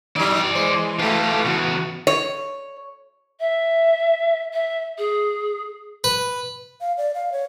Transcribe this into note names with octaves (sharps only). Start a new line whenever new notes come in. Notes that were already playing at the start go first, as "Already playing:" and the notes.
E3 F#3 D#4 G#4 D5
G#3 C5
B2 G#3 A3 F4 G4
E2 C#3 F#4
C#5
E5
E5
G#4
B4
F5
D5
F5
C#5